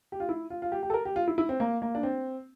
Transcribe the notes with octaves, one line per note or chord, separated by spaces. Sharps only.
G4
F4
E4
F4
F4
G4
G4
A4
A#4
G4
F4
E4
E4
C4
A#3
A#3
D4
C4